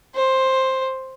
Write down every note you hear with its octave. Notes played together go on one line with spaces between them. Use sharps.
C5